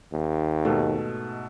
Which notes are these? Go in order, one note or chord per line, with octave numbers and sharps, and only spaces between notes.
D#2
G#2 B2 A3